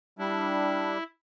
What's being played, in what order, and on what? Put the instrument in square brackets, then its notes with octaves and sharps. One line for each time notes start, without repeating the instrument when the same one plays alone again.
[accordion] G3 D4 [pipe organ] E4